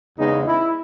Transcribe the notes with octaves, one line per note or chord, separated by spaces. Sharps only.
E2 C#3 G#3 B3 D#4
E4